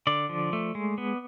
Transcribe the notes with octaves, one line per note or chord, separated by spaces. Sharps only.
D3 D5
F3
A3
G#3
B3